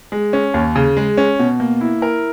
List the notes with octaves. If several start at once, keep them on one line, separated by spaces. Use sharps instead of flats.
G#3
C#4
D#2
C#3
G#3
C#4
B2
A#3
E4
A#4